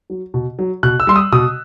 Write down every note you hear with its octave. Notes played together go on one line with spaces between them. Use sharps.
F#3
B2
F#3
B2 F#6
E6
G3 C6
D#6
B2 D#6